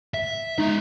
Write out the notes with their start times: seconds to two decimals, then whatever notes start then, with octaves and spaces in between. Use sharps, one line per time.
0.14 E5
0.58 G#3 D#4 E5